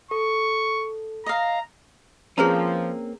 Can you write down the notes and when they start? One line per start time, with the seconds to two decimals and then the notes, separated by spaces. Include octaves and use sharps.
0.11 A4 C#6
1.26 D#5 F5 A#5
2.38 F3 A#3 C4 C#4 G#4 B4 A#5